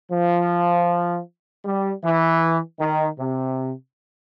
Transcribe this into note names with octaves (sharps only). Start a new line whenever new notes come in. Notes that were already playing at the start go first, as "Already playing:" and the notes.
F3
G3
E3
D#3
C3